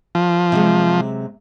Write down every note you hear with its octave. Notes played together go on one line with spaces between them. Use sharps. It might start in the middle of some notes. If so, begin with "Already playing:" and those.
F3
C3 F#3 G#3